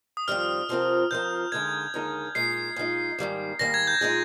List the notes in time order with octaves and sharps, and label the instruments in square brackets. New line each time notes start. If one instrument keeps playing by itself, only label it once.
[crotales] D#6
[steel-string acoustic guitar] F2 D#3 G3 C4 [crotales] F6
[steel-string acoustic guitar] C3 F3 C4 F4 A#4
[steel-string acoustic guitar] C3 F3 C4 F4 A#4 [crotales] G6
[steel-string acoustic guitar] D#2 D3 G#3 D#4 A#4 [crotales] G#6
[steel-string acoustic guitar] D#2 D3 G#3 D#4 A#4
[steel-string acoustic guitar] A#2 G#3 D#4 [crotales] C7
[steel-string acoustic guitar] A#2 G#3 D#4
G#2 D#3 G3 A#3
[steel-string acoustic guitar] G#2 D#3 G3 A#3 [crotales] A#6
[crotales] G#6
G6
[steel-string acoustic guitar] A#2 G#3 D#4 G#4